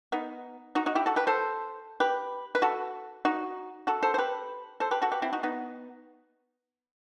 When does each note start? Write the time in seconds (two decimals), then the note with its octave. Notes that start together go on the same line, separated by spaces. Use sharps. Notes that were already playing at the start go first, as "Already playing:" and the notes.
0.12 B3 D#4
0.75 D#4 F#4
0.86 D#4 F#4
0.95 E4 G4
1.06 F#4 A4
1.16 G4 B4
1.27 A4 C5
2.00 G4 B4
2.55 B4
2.62 F#4 A4
3.25 D#4 F#4
3.87 F#4 A4
4.02 A4 C5
4.14 C5
4.18 G4 B4
4.80 A4 C5
4.91 G4 B4
5.02 F#4 A4
5.12 G4 B4
5.22 C4 E4
5.33 D#4 F#4
5.43 B3 D#4